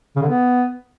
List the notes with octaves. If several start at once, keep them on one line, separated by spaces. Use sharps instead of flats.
C#3
D3
B3